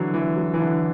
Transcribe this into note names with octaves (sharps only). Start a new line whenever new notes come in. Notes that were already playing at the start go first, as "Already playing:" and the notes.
Already playing: D3 E3 F#3
E3
F#3
E3
D3